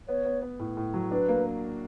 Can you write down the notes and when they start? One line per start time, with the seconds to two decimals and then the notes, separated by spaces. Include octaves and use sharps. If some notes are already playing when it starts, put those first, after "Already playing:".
0.08 B3 C#5
0.25 B3
0.42 B3
0.59 A2
0.77 A2
0.94 F#3
1.11 D4 B4
1.28 A#3